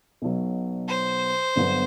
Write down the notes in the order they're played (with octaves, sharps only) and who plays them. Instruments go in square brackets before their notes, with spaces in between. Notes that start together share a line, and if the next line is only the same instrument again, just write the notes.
[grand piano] B1 B2 F#3
[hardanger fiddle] C5
[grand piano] G1 G2 F#3 B3 D4